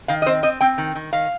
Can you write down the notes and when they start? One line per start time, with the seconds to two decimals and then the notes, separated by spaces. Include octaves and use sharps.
0.08 D#3 F5
0.22 D#5
0.26 C4 C5
0.43 C4 D#5
0.61 C4 G5
0.78 D#3
0.95 D#3
1.13 D#3 F5